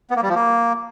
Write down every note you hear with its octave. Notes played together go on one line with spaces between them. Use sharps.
B3
A#3
G3
F3
A#3